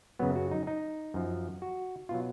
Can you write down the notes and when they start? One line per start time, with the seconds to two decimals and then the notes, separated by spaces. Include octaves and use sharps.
0.19 F#2 C#3 F#3 B3
0.36 F#4
0.51 D#4
0.67 D#4
1.14 F#2 F3
1.62 F#4
2.09 B2 F#3 F4